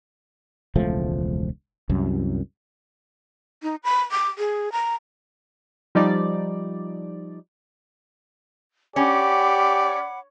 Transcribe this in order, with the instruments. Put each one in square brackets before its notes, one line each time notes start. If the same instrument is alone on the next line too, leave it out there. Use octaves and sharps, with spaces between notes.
[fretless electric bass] E1 C#2 F3 A3
C2 F#2
[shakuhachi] D#4
B5
D6
G#4
A#5
[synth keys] F3 G3 D#4 D5
[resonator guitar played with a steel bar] C#4 [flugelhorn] G4 [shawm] D5 [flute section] F#5 B5 D6